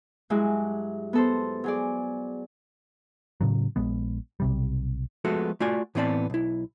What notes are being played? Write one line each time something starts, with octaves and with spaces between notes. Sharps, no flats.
G2 F#3 G#3 E4 F#4
B3 A4 C5
F#3 G#4 D5
A2 C#3 F#3
A#1 G#3 B3
B1 C3 G3
F3 G#3 A3 B3 F#4 A4
A3 F4 F#4 D5 G#5
A2 E3 B3 C4 D5 A5
B1 E4